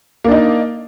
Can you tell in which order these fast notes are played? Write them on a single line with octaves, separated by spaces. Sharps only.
A#3 D4 D#4